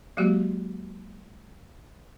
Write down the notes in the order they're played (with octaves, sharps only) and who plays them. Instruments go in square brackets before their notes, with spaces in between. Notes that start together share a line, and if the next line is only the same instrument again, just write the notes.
[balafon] F#3 G#3 A#3 F#4 G4